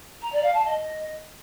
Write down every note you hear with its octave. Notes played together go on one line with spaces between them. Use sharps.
A#5
D5
F5
A5
D#5